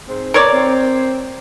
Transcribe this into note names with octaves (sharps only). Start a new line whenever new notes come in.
G#2 C4
B2 A#4 C#5 D5
C4